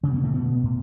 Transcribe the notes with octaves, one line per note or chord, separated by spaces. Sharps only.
D2 C#3 D3 C#4
B2 B3
A2 A3
B2 B3
A2